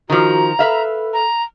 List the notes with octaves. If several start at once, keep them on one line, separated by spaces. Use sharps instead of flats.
D#3 F3 F#4 A#5
A4 B4 E5 F5
A#5